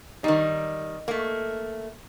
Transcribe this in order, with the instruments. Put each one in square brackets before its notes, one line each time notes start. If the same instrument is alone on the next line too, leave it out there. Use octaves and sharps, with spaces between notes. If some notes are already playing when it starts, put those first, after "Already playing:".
[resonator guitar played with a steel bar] D#3 G3 [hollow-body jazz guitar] D#4
[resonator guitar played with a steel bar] A3 A#3